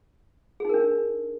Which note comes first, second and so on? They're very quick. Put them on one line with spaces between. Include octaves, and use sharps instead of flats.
G#4 D#4 A#4 D4